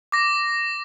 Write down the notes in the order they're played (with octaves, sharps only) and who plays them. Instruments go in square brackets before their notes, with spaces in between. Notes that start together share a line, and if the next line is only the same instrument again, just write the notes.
[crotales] D6 A#6